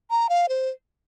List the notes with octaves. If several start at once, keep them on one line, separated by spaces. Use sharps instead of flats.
A#5
F5
C5